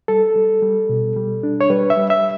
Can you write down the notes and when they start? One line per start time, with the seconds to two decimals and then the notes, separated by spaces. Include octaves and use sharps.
0.08 G3 A4
0.35 G3
0.62 G3
0.89 B2
1.16 G3
1.43 D4
1.61 C#5
1.70 G3 B4
1.90 E5
1.97 G3
2.10 E5